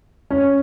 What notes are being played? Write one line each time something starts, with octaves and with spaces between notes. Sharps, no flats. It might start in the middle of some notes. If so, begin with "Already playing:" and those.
C#4